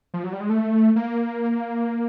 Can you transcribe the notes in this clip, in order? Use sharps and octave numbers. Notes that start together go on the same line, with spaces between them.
F3
F#3
G3
G#3
A3
A#3